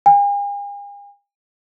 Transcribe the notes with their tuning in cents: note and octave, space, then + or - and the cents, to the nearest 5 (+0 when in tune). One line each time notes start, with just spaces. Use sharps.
G#5 -45